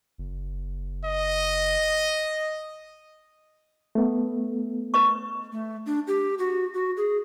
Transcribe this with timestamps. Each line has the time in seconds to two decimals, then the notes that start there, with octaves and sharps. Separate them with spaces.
0.18 F#1
1.05 D#5
3.95 A3 B3
4.94 B4 D#5 C#6
5.52 A3
5.86 D4
6.08 G4
6.39 F#4
6.74 F#4
6.97 G#4